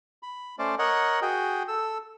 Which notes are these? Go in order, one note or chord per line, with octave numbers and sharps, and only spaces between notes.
B5
A3 C#4 C5 D5
A#4 C#5 D#5 F#5
F#4 G#4 G5
A4 E6